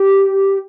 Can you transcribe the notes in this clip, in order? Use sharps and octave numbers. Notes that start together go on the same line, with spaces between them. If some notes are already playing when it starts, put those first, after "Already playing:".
Already playing: G4